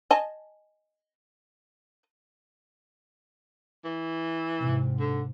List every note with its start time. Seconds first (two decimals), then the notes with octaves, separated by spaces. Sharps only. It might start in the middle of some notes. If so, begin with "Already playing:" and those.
0.11 D#5 G#5 A5
3.84 E3
4.59 G#2 C3
4.99 D3